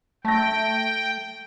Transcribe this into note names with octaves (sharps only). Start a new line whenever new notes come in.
A3 G5 A5 A#6